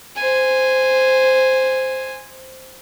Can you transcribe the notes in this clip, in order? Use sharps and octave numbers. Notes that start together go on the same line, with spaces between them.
C5 G#5